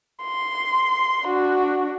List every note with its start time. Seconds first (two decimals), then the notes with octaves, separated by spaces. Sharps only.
0.24 C6
1.26 D4 F#4